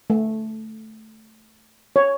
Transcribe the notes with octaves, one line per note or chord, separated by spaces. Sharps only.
A3
C#5